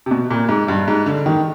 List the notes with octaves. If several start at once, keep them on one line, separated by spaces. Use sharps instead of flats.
C3
B2
A#2
G#2
G2
G#2
D3
D#3